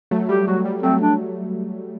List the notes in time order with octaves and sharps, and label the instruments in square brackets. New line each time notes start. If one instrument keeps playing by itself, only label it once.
[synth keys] F#3 A3
[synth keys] G3 [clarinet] G4
[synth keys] F#3 [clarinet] F#4
[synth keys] G3
[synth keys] F#3 A3 [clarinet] C4
[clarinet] D4